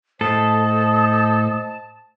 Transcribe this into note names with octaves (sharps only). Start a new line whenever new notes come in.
A2 A4 C5 D#5 A5 D#6